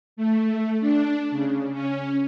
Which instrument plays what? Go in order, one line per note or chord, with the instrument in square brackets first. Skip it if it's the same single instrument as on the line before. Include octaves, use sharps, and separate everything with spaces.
[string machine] A3
D4
C#3
C#4